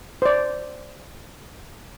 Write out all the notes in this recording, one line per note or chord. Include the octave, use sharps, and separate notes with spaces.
C5 D5